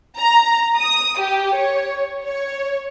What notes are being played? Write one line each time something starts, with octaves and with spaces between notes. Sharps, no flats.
A#5
D#6
G4
C#5
C#5